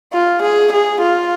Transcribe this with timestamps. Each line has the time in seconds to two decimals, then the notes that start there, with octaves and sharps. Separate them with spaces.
0.13 F4
0.42 G#4
0.72 G#4
1.02 F4